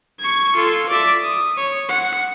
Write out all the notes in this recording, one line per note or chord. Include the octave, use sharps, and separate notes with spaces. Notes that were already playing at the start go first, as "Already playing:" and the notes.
C#6 G#6
F4 A4
D5 E5
D#6
C#5
F#5